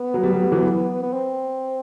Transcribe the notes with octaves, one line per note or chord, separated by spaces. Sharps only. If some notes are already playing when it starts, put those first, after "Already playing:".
Already playing: B3
F#3
G3
F#3
G3
E3 F#3
B3
C4